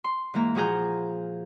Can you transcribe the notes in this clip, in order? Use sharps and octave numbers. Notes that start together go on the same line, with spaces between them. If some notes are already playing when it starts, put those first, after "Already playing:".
C6
G#2 E3 A#3 A#5
A#2 F3 F#4 G#4 A#5 G6